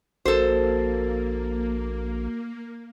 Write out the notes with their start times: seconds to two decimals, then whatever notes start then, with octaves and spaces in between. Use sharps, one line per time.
0.25 A#1 A#3 F#4 A4 A#4 C5